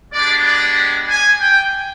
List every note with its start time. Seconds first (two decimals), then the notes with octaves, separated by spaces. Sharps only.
0.12 G#3 B3 D4 G4 D5
0.45 D5
1.08 G#5
1.40 G5